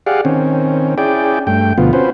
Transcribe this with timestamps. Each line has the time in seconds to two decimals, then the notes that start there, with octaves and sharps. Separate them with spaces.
0.07 G4 G#4 D5 F5 F#5
0.25 D#3 C4 C#4
0.98 C#4 E4 G#4 D5 G5
1.47 G2 A3 G5
1.78 D2 B2 F3 B3 F4
1.93 C4 C#4 F4 F#4 B4 C5